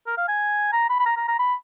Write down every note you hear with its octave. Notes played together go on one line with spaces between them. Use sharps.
A#4
F5
G#5
A#5
B5
B5
A#5
A#5
A#5
B5